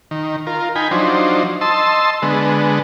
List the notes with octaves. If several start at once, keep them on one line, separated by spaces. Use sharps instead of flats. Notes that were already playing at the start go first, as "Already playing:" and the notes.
D#3
F4 A#4
D#4 G5 G#5 B5
F3 F#3 D4 D#4 C5
D#5 A5 C6 E6
D3 G#3 B3